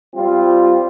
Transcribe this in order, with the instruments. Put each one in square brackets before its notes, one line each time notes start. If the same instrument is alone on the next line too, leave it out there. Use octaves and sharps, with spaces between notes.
[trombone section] G3 C4 F4